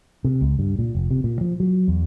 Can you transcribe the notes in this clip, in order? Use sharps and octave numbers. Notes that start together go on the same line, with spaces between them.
C3
C#2
G2
A#2
F1
C3
A#2
F3
F#3
E2